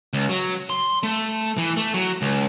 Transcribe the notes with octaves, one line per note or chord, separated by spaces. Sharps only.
C#2
F#3
C6
A3
E3
A3
F#3
C#2